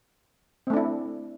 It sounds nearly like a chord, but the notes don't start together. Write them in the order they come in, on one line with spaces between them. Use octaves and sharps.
C4 A3 D4 E4